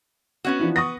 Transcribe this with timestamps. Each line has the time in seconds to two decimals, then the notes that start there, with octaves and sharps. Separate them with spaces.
0.45 B3 C#4 F#4
0.59 E3 F3 D4
0.76 B3 C#6 D#6 A#6